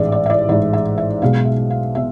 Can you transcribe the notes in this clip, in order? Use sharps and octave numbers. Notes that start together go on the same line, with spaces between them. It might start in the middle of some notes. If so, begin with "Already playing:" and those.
Already playing: A1 G#2 G#3 D5 E5
D5
E5
D5
A1 G#2 G#3 D5
E5
E5
B1 B2 G#3 F5
E5
F5
B2 E5